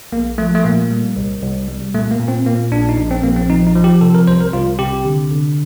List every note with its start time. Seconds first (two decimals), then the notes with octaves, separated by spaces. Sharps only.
0.12 A#1 A#3
0.38 F3 A3
0.55 A3
0.64 A#2 A#3
0.90 G3
1.16 C2
1.42 C2
1.68 G3
1.94 A#2 A3
2.11 A#3
2.20 A#2
2.28 C4
2.46 A#2 A#3
2.72 A#1 D4
2.89 D#4
2.97 A#1 D4
3.11 C4
3.23 A#1 A#3
3.37 C4
3.50 F3 D#4
3.67 D#4
3.76 F3
3.84 G4
4.01 C3 A4
4.15 A#4
4.27 C2 C5
4.40 A#4
4.53 C2 F4
4.79 C3 G4
5.05 D3
5.31 D3